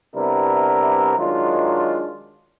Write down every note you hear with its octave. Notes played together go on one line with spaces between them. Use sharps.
C3 G3 B3 D4 E4 A#4
D#3 F#3 G#3 D4 F4